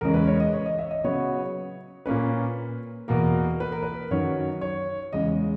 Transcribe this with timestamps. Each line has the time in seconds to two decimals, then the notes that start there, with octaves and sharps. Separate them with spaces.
0.01 E2 C#3 G#3 C#4 A#4
0.14 B4
0.27 C#5
0.40 D#5
0.53 C#5
0.66 D#5
0.79 E5
0.91 D#5
1.04 C#3 F#3 B3 C#5
2.06 A#2 A#3 C#4 B4
3.08 E2 B2 A#3 A#4
3.60 B4
3.72 A#4
3.83 B4
4.11 F#2 D#3 F#3 C#5
4.61 C#5
5.13 E2 C#3 G#3 D#5